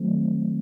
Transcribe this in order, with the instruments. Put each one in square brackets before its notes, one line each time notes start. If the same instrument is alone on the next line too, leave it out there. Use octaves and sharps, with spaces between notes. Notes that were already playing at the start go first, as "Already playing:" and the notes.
Already playing: [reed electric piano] D#3 F#3 A3 C4